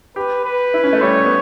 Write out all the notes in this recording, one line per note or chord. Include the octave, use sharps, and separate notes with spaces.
G4 B4
B4
E4
C#4
A3
G3 C#5
B3